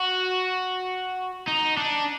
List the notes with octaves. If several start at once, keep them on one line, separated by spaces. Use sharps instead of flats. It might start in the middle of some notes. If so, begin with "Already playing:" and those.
Already playing: F#4
D#4
D4